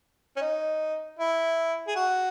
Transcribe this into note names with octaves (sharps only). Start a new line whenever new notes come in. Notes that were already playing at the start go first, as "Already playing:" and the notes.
C#4
D#4
E4
G#4
F#4